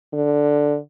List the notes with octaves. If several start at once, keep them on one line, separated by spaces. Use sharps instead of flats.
D3